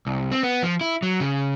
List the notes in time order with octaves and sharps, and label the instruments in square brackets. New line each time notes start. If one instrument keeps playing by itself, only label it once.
[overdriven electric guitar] C2
C4
B3
F3
E4
F#3
C#3